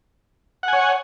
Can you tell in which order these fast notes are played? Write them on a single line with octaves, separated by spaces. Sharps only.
F#5 G#5 C#5